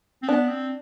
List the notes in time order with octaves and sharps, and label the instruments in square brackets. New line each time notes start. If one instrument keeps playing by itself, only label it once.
[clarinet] C4
[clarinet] B3 [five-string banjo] D4
[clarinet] C4